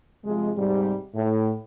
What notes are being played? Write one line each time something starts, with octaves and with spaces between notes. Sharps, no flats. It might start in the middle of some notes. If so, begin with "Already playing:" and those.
C3 F3 G#3
G#2 C3 G3
A2